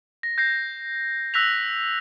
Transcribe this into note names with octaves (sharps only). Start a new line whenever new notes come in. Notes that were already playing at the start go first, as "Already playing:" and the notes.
A#6
G6 A#6 C7
E6 F#6 A#6 B6 F7